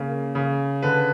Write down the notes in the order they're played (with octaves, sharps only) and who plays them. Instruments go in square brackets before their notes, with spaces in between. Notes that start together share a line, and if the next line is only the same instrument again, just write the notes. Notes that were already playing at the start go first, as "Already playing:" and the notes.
Already playing: [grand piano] C#3 A#3
C#3
D3 B4